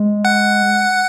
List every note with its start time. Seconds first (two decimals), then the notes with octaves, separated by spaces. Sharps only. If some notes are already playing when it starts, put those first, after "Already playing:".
Already playing: G#3
0.25 F#5